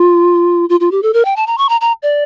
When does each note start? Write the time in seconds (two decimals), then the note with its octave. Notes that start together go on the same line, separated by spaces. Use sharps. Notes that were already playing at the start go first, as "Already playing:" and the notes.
Already playing: F4
0.69 F4
0.80 F4
0.92 G4
1.03 A4
1.14 A#4
1.25 G5
1.36 A5
1.47 A#5
1.58 C#6
1.69 A#5
1.81 A#5
2.03 D5